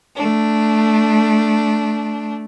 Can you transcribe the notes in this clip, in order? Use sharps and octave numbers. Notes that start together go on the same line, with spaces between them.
A3 D4